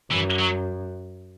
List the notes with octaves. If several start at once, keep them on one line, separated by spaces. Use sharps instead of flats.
F#2 E3
F#3